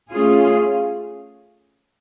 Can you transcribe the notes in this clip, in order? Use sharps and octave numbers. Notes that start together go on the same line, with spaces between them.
A3 C#4 F4 G#4